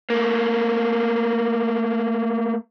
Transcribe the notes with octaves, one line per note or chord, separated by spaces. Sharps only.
A3 A#3